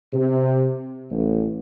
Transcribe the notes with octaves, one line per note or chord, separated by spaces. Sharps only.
C3
A1